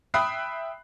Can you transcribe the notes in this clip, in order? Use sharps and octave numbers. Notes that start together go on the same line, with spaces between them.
E5 G5 B5 D#6 F#6 C7